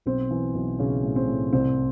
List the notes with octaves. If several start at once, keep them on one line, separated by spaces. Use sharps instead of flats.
B1 C4
E3
B1
B1 C#3 C#4
A2
C4
A2
C2 C4